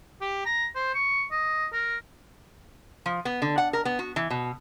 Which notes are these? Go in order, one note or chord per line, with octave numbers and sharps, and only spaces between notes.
G4
A#5
C5
C#6
D#5
A#4
F3
B3
D3
F#5
A#4
B3
F#4
E3
B2